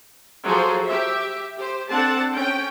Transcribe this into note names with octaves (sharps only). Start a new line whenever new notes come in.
F3 F#3 G#4 A4 C5
G4 E5
G4 C5
C4 D4 A4 F#5 A5
C#4 G5